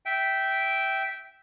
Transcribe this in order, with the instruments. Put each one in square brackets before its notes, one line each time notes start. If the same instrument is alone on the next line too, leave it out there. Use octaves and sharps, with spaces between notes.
[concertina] E5 G5